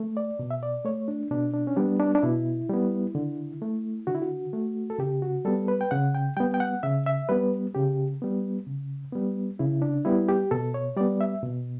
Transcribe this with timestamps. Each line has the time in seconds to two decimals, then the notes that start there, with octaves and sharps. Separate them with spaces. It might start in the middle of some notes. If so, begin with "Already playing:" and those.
Already playing: A3
0.17 D5
0.39 B2
0.51 E5
0.63 D5
0.85 A3 C#5
1.08 D4
1.31 B2 D4
1.54 D4
1.67 C#4
1.77 G3 B3 D4
2.00 D4
2.15 D4
2.23 B2 E4
2.69 G3 B3
3.15 D3
3.62 A3
4.07 D3 F#4
4.15 E4
4.22 F#4
4.53 A3
4.90 A4
4.99 C#3 G4
5.22 F#4
5.45 G3 B3 A4
5.68 B4
5.81 G5
5.91 C#3 F#5
6.15 G5
6.37 G3 B3 G5
6.54 G5
6.60 F#5
6.83 C#3 E5
7.06 E5
7.29 G3 B3 B4
7.75 C#3 G4
8.22 G3 B3
8.67 C#3
9.13 G3 B3
9.59 C#3 E4
9.82 D4
10.05 G3 B3 E4
10.29 G4
10.51 B2 A4
10.74 C#5
10.97 G3 B3 D5
11.21 E5
11.43 B2